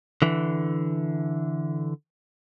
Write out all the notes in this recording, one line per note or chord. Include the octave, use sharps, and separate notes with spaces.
D3 E3